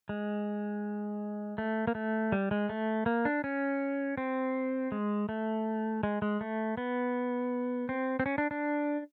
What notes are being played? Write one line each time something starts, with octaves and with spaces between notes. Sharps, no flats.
G#3
A3
A#3
A3
G3
G#3
A3
A#3
D4
C#4
C4
G#3
A3
G#3
G#3
A3
B3
C4
C4
C#4
D4
D4